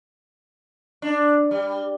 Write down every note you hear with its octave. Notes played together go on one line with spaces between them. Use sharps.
D4
G3